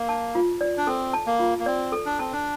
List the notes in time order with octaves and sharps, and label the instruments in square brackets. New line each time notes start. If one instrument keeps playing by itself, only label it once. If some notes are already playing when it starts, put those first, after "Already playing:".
Already playing: [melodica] A#3
[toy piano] A5
F4
D5
[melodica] D4
[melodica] C4 [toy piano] A4
[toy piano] A5
[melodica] A#3
[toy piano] F4
[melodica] A#3
[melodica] C4 [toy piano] D5
[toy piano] A4
[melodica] D4
[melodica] C4 [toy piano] A5
[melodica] D4